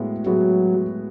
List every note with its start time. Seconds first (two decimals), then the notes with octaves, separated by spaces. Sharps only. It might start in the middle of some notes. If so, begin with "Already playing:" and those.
Already playing: A2 G#3 B3 F#4
0.26 A2 F#3 G#3 B3 F#4